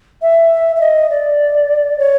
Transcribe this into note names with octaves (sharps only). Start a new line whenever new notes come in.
E5
E5
D#5
D5
C#5